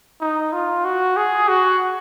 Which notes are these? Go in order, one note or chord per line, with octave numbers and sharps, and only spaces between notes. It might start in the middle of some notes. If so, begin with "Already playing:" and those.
D#4
F4
F#4
G#4
F#4